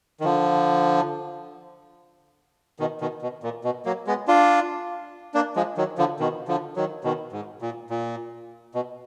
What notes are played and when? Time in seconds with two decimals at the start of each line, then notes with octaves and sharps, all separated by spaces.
0.20 D#3
0.24 D3 F3
2.80 B2 D#3
3.01 B2 D#3
3.22 B2
3.43 A#2
3.64 B2
3.85 F#3 A#3
4.07 G#3 B3
4.28 D4 F4
5.34 A#3 D4
5.56 F3 G#3
5.77 D#3 F#3
5.98 D3 F3
6.20 B2 D#3
6.48 D3 F3
6.76 D#3 F#3
7.04 B2 D#3
7.32 G#2
7.62 A#2
7.90 A#2
8.75 B2